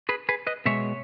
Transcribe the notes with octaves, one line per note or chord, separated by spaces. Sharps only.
G#4 B4
G#4 B4
B4 D#5
B2 G#3 C#5 E5